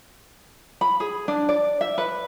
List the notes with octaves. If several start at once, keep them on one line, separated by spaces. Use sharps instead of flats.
B5
G#4
D4
D5
E5
B4